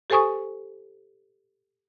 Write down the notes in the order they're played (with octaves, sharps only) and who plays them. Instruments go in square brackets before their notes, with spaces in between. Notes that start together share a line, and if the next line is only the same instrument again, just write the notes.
[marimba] G4 A4 C5 G#5 C#6 D#6